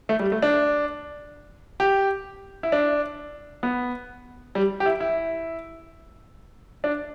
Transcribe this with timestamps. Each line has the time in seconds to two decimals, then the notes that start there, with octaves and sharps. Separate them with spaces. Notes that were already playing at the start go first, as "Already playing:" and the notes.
0.09 A3
0.19 G3
0.32 A3
0.42 D4
1.80 G4
2.63 E4
2.72 D4
3.63 B3
4.55 G3
4.80 G4
4.86 E4
5.00 E4
6.84 D4